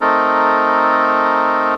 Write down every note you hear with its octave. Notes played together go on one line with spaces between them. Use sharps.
A3 C4 D#4 A4 A#4